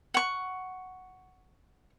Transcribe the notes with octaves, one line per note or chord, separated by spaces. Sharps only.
F#5 C#6